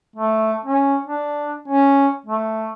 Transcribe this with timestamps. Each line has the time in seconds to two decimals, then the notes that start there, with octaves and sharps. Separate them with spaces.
0.16 A3
0.65 C#4
1.06 D4
1.68 C#4
2.26 A3